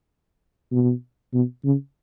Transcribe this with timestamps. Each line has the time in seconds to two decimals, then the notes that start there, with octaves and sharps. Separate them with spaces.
0.72 B2
1.33 B2
1.64 C#3